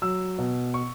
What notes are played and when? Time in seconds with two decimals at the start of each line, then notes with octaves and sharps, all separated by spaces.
0.02 F#3 E6
0.39 B2
0.74 C#6